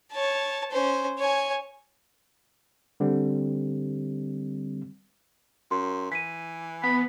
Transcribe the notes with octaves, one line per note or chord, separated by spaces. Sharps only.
C#5 A5
C#4 C5
C#5 G#5
D3 G3 C4
F#2 C6
E3 B6 D#7
B3 B5